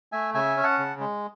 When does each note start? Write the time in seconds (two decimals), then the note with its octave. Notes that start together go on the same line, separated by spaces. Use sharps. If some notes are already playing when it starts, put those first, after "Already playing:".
0.12 A3 E5 G#5
0.34 C#3 E5 G#5
0.57 C#4
0.63 F#5 A5
0.78 C#3
1.00 G#3